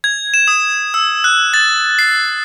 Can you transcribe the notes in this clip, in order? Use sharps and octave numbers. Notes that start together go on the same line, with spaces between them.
G#6
E7
D#6
E6
F#6
A6
C7